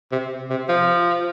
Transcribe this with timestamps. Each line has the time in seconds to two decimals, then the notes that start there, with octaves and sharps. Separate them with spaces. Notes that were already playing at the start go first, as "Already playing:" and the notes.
0.12 C3
0.50 C3
0.69 F3